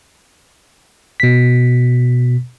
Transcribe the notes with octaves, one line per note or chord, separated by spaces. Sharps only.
B2 B6